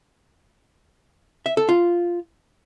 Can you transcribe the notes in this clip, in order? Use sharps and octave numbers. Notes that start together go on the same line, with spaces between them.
E5
A4
F4